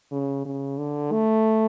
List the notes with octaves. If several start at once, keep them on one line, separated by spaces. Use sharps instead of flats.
C#3
C#3
D3
A3